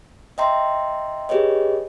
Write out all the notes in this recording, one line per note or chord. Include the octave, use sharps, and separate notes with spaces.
D#5 E5 G5 A#5 C6
G4 G#4 B4 C#5 D#5